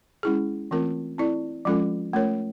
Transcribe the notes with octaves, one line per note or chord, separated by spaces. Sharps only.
G#3 C#4 E4 G#4
E3 A3 C4 F4 A#4
C4 E4 A4 D5
F3 G#3 C#4 F4 A4
A3 C#4 F4 A#4 C#5